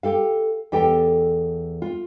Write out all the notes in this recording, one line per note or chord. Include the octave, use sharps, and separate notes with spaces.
G4 A4 F5
E2 G4 A4 G5
F4